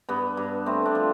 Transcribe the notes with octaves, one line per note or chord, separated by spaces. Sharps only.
G2 B3
G2
A3 C4
D4
F3